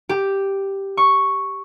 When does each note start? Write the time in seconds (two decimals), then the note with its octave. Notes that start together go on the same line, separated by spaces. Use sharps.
0.09 G4
0.97 C#6